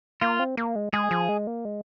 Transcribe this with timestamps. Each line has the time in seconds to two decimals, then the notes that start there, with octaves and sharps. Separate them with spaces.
0.21 A#3 F4
0.39 C4
0.57 A#3
0.76 G#3
0.93 G#3 G#4
1.11 F3
1.29 G#3
1.47 A#3
1.65 G#3